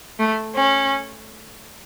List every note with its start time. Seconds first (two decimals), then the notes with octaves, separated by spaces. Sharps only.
0.19 A3
0.56 C#4